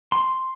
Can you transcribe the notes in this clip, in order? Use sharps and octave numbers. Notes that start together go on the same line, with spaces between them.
C6